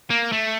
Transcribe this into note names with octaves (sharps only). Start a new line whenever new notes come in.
A#3
A3